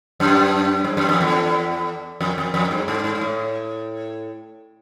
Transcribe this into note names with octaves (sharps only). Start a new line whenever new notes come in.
F#2
G2
F#2
F2
E2
F2
F2
F2
G2
G#2
G#2
G#2
A2